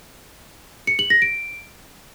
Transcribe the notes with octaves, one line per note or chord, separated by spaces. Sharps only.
C#7
F#7
A#6
D7